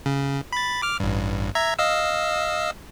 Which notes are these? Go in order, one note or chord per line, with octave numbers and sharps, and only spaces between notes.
C#3
B5 A6
D6 F6
A1 G2
E5 A#5 G#6
D#5 F5 E6